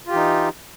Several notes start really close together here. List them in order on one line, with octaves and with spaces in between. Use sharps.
F4 G4 E3 D#4